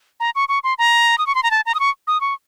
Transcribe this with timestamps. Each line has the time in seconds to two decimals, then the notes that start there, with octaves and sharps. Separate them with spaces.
0.20 A#5
0.35 C#6
0.49 C#6
0.64 C6
0.78 A#5
1.18 D#6
1.27 C#6
1.35 C6
1.43 A#5
1.51 A5
1.66 A#5
1.75 D#6
1.80 C#6
2.07 D#6
2.21 C#6